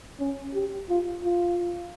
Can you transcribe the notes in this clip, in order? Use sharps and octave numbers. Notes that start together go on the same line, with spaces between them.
C#4
G4
F4
F4